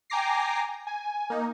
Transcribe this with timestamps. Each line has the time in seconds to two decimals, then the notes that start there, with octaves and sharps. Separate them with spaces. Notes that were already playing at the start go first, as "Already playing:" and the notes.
0.10 G5 G#5 A#5 D6 A#6 C7
0.87 G#5
1.30 A#3 D#4